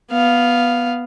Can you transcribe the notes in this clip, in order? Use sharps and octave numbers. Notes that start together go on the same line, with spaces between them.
B3 F5